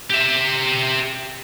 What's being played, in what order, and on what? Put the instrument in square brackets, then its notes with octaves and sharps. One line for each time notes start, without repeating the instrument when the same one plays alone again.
[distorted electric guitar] G4 E5